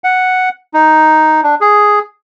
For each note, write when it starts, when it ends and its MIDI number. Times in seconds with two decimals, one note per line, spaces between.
0.04 0.49 78
0.74 1.41 63
1.43 1.55 62
1.61 1.99 68